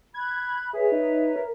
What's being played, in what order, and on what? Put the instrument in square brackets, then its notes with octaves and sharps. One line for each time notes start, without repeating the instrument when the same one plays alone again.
[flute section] B5 F#6 [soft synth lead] G#6
[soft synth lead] G#4 [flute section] B4 C#5 E5
[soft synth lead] D#4
A#4